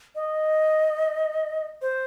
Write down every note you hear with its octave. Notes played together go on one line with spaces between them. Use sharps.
D#5
C5